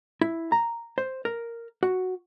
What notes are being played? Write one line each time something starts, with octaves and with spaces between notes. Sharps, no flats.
E4
A#5
C5
A#4
F#4